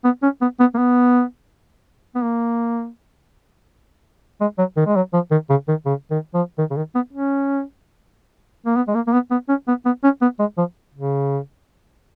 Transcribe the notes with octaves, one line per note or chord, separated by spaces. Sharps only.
B3
C#4
B3
B3
A#3
B3
B3
A#3
G#3
F#3
D#3
G#3
F#3
F3
D#3
C#3
D#3
C#3
D#3
F3
D#3
C#3
D#3
B3
C#4
A#3
B3
G#3
A#3
A#3
B3
B3
C#4
B3
B3
C#4
B3
G#3
F3
C#3